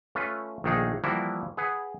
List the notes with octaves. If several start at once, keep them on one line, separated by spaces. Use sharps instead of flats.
A3 C#4 F4 B4
A#1 D#3 A3 D4 D#4 G#4
E3 F3 G3 A#3 E4 F#4
G#4 B4 F#5